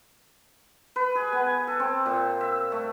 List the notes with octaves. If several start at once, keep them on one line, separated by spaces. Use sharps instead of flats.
B4
G#4
B3
G#5
A4
C4
A#2
E5
A3